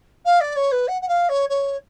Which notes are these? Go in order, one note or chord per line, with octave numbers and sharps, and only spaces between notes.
F5
D5
C#5
B4
F#5
F#5
F5
C#5
C#5